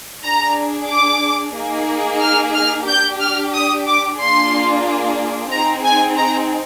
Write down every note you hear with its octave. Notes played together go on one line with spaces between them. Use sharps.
D4 G#4 A#5
D6
A#3 D#4 G#4
F6
F6
D4 G4 G6
F6
D#6
D6
A#3 D4 F4 G#4 C6
C4 D#4 G#4 A#5
G#5
A#5